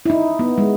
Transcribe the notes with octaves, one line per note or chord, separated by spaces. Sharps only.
E4
D#4
B3
G#3